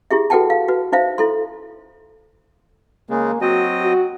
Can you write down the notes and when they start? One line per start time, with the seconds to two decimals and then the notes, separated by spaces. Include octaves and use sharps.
0.11 E4 G4 G#4 E5
0.30 F#4 A4 B4 F#5 G5 A5
0.50 F5
0.68 F#4 B4
0.92 D#4 C5 E5 F5
1.18 E4 A4 C6
3.10 C#3 G#3 A#3
3.41 F#3 C4 F#4 D#5
3.82 F#4